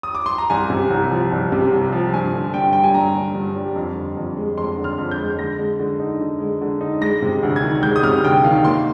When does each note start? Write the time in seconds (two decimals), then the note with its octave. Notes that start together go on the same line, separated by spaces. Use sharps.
0.03 D#6
0.15 D6
0.26 C6
0.38 A#5
0.50 C2 G#5
0.70 C3
0.90 C2
1.11 F3
1.32 C2
1.52 C3
1.72 C2
1.92 F3
2.14 G2 G#5
2.34 D3
2.54 G2 G5
2.73 G3 G5
2.83 G#5
2.94 G2 A#5
3.15 D3
3.35 G2
3.56 G3
3.76 F2
3.96 D3
4.17 F2
4.37 G#3
4.57 F2 C6
4.78 D3
4.84 F6
4.98 F2
5.11 G6
5.19 G#3
5.38 D3 A#6
5.59 G#3
5.80 D3
5.99 D#4
6.21 D3
6.40 G#3
6.62 D3
6.81 D#4
7.01 G#3 A#6
7.22 C3
7.43 D2
7.56 G#6
7.63 D#3
7.83 G#3 G6
7.96 D#6
8.03 C3 F6
8.24 D2 G5
8.44 D#3 F5
8.64 A#3 C6